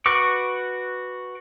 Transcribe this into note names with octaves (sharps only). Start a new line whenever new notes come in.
F#4 B4 C#6 D6